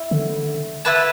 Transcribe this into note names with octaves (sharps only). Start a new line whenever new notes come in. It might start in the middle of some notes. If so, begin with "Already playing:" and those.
Already playing: E4
D3
E4 B4 F#5 A5